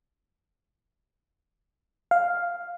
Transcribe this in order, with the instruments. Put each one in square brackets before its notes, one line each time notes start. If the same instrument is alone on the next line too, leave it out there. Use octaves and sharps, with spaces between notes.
[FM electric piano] F5